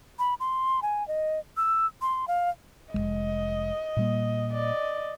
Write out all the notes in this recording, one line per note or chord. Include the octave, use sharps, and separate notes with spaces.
B5
C6
G#5
D#5
E6
C6
F5
F1 C#2 G#3 D#5
A#2 G3 A#3
D5 D#5